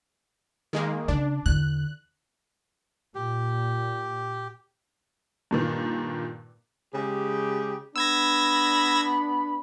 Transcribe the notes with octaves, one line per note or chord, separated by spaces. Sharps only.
D#3 G#3 A#3
C#3 D4
E2 D3 F#6
A#2 G4
G2 A#2 D#3
C#3 G#3 G4
B3 D4 B5 E6 G#6 A#6